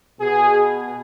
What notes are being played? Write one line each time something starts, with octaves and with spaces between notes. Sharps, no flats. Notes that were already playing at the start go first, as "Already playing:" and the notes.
B2 G#4